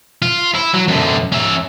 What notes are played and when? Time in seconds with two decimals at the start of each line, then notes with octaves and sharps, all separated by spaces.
0.22 F4
0.55 E4
0.74 F#3
0.88 F#2 D3
1.32 C#4 E5